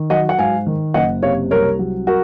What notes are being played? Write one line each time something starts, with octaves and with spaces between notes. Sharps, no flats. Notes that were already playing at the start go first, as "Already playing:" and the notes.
Already playing: D#3
F#3 D#5 F#5
F#5
G#2 F5 G#5
D#3
F#1 D#5 F#5
C3 C#5 F5
C2 A#4 C#5
F#3
F#4 A#4